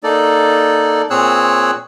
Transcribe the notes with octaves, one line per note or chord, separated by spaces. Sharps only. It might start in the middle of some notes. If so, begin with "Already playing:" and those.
A#3 D#4 A4 D5
A#2 C4 G#4 C#5 E6 F#6